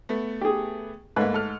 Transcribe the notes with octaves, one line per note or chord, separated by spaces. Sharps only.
A3 B3
G4 G#4
G#2 A3 A#3 B4 F#6
A4 F6